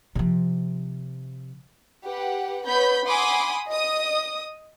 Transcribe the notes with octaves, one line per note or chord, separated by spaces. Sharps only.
C3 F3
G4 B4 F#5
B3 B4 C#5 B5 G6
F#5 G#5 B5 C6 D6 D#6
D#5 D#6